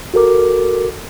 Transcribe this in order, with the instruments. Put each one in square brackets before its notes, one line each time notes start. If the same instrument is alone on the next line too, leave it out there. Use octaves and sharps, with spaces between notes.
[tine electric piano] F#4 A4 A#4 D6